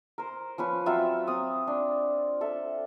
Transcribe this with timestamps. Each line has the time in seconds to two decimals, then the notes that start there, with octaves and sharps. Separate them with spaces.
0.18 A#4 C5
0.58 F3 C#4 B4
0.86 F#3 C4 F4 E5
1.27 C4 D#6
1.67 D4
2.41 A4 E5